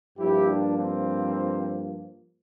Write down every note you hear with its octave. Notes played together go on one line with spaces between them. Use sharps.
G2 F3 A#3 E4 G4
D4
C4